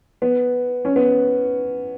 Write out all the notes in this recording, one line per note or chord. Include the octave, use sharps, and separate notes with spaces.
B3
C#4
B3